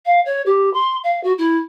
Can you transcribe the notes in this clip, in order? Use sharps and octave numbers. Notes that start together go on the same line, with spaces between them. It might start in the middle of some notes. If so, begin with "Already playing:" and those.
F5
C#5
G4
C6
F5
F#4
E4